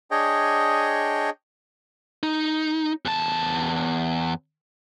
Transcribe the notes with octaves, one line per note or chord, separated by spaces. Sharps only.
D4 G#4 C#5 D#5 G5
D#4
E2 A5